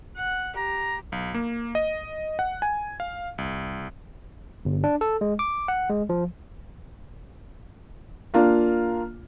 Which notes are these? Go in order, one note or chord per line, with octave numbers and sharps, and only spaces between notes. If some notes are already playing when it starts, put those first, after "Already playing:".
F#5
G4 A#5
B1
A#3
D#5
F#5
G#5
F5
C2
G1
D4
A4
G#3
D6
F#5
G#3
F3
A#3 D4 F4